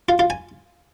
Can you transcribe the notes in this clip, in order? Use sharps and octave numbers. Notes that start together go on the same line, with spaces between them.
F4
F4
G#5